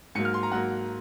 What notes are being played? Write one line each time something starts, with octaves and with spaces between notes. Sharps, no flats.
G#2 F#3 A#3 C#7
F6
C6
A#5
G#2 F#3 A#3 F#5